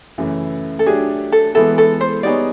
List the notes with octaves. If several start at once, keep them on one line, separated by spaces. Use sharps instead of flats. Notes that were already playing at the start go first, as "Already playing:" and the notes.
F#2 C#3 E3 A3
A4
F#3 A3 D4 G4 G#4
A4
E3 G#3 B3 E4 A4
A4
C5
G3 B3 D#4 G#4 C#5 D5